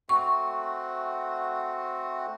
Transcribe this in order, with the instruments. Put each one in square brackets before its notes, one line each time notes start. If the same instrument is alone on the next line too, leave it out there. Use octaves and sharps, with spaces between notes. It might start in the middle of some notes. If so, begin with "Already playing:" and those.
[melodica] A3 C4 F#4 [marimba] C#6